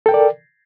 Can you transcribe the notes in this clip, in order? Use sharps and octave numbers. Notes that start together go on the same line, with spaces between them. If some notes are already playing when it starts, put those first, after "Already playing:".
A4 A#4 D5 G5